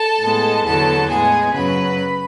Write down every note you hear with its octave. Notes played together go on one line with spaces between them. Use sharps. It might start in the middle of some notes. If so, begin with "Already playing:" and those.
Already playing: A4 A5
A2 G#3 B3
E2 D3 F#3 B3 A4 A5
A2 G#3 B3 G#4 G#5
F#2 C#3 F#3 B4 B5
B5